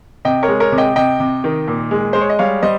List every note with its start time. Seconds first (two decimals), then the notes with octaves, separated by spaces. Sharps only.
0.25 C3 D#5 G5
0.43 A#4 C#5
0.48 G#3
0.60 A#4 C#5
0.72 C3
0.78 D#5 G5
0.96 C3 D#5 G5
1.20 C3
1.44 D#3
1.68 A#2
1.91 G#3
2.13 G#3 C5
2.21 C#5
2.30 D#5
2.39 G3 C#5 F5
2.62 G3 C5 D#5